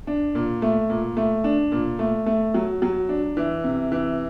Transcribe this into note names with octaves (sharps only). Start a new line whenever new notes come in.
D4
A#2
A3
A#2
A3
D4
A#2
A3
A3
F#3
F#3
D4
E3
C3
E3